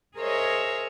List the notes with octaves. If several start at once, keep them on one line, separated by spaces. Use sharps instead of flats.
G#4 A#4 C5 C#5 D#5 E5